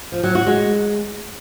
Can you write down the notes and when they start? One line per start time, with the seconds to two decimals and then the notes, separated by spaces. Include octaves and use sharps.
0.12 F3
0.23 F#3
0.35 F#4
0.47 G#3